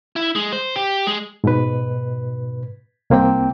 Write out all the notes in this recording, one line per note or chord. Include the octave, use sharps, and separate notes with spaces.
E4
G#3
C5
G4
G#3
G#2 B2 B4
C2 A#3 C4 G5